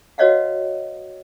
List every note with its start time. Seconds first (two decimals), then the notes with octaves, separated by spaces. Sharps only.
0.18 F#4 B4 C#5 D#5 F5 F#5